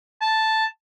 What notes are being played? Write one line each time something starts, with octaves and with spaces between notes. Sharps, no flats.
A5